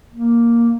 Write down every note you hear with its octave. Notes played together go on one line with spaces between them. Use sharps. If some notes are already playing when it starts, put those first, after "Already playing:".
A#3